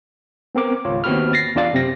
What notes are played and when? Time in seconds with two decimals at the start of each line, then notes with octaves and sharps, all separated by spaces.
0.55 B3 C4 A#4 D6
0.85 G#1 C#2 F4 C#5
1.04 D#2 B3 C4 F#4 B5 F6
1.33 A6 A#6 C7
1.55 E2 D4 F4 D5 F5 A6
1.73 F#2 C3 C4 A#6